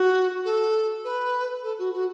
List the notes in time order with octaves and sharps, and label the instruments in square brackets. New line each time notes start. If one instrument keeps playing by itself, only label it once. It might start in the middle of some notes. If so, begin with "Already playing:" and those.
Already playing: [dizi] F#4
A4
B4
A4
F#4
F#4